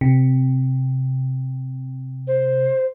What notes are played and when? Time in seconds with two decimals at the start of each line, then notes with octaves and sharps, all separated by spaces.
0.01 C3
2.27 C5